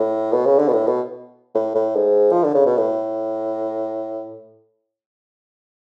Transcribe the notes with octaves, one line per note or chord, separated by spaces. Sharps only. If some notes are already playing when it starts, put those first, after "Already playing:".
Already playing: A2
B2
C#3
D3
B2
A2
B2
A2
A2
G#2
F3
D3
C#3
B2
A2